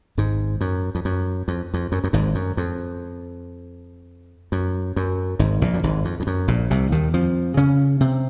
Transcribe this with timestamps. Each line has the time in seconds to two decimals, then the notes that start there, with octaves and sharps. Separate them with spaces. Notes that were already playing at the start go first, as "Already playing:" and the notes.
0.18 G#1 G#2
0.61 F#2
0.95 F2
1.05 F#2
1.48 F2
1.74 F2
1.92 F#2
2.04 F#2
2.13 G#1 G#2
2.35 F#2
2.57 F2
4.52 F#2
4.96 F#2
5.39 G#1 G#2
5.61 A#1 A#2
5.74 F#2
5.83 G#1 G#2
6.05 F2
6.20 F2
6.27 F#2
6.48 A#1 A#2
6.70 C2 C3
6.92 D#2 D#3
7.14 F2 F3
7.57 C#3 C#4
8.00 C3 C4